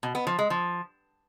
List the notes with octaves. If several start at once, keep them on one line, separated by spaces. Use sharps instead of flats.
B2
B3
F3
G#3
F3